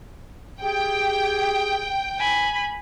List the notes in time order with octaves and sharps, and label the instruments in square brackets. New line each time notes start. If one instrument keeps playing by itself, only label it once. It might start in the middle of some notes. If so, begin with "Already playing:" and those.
[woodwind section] G4 G#4 [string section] G5
[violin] G#5 B5